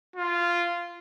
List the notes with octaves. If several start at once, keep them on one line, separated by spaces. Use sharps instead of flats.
F4